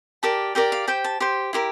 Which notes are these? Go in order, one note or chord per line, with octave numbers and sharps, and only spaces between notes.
G4 A#4 D5 A5
G4 A#4 D5 G5
F5
G4 C5 G5
A5
G4 C5 C6
E4 G4 A#4